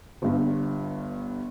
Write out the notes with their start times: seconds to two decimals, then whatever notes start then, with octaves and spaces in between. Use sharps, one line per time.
0.22 G1 G2